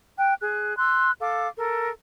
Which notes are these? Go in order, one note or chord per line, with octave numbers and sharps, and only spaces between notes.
G5 F#6
G#4 F#6
C6 E6 F#6
A4 F5 D6
A4 A#4